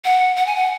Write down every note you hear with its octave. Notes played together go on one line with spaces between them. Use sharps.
F#5
F#5
G#5
F#5